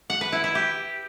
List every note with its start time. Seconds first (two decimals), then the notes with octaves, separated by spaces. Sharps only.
0.10 F#5
0.21 B4
0.32 E4
0.44 E4
0.55 G4